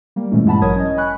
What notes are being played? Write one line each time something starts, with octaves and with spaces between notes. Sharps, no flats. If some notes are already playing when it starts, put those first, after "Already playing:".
G3 A#3
A#2 E3 G#3 A3 C#4 E4
G2 G#3 E4 F#5 A5 B5
A1 F#3 A#4 C#5 D#6 G#6
C#4 D#5
G#5 B5 C#6 F#6